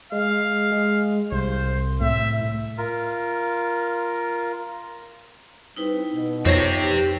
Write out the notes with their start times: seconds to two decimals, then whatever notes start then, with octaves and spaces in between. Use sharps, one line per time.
0.12 G#3 F5
0.72 G#3
1.32 C2 C5
2.01 A2 E5
2.78 F4 A#4
5.77 G2 C4 D#4 E4 B4
6.14 B2
6.45 F2 C3 C4 C#5 A#6
6.78 G4